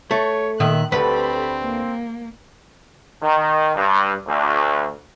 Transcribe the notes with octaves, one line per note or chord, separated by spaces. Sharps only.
A3 C#5
A#2 D#3 E5 F#6
D2 C4 G4 A4 B4 B5
A#3
D#3
G2
D2